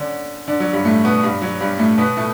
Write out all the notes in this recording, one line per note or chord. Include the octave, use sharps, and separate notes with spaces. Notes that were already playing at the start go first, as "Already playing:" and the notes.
Already playing: D3 C#4 D4
D3 D4
F#3
G2 G3
A2 A3
B2 B3
G2 G3
F#3
G2 G3
A2 A3
B2 B3
A2 A3